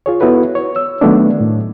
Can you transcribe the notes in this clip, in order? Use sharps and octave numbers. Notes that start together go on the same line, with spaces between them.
F4 G#4 C#5
B3 E4 F#4 A4 B4
C#5
E6
D#3 F#3 A3 B3 D4
A2